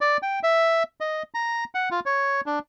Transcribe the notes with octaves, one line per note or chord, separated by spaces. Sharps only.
D5
G5
E5
D#5
A#5
F#5
F4
C#5
D4